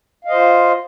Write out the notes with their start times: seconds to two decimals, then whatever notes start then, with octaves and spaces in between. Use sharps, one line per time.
0.25 F5
0.28 D#5
0.31 C5
0.34 F4